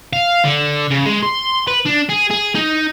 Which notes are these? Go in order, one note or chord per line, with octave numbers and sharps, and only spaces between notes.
F5
D3
C#3
G#3
C6
B4
D4
G#4
G#4
D#4